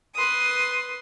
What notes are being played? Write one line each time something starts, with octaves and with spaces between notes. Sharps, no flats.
B4 C6 D#6